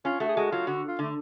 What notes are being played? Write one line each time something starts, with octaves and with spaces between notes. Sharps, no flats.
C#4 F4
A3 F#4
G#4
G#3 F#4
F#3 F4
D3 F#4
F4
D3 A3